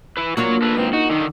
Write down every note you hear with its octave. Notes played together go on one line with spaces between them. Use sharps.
E4 B4
A#3 D4 F4 F#4 C#5
A4 B4
G#2 C4 B4
D#4 F#4
D3 D#3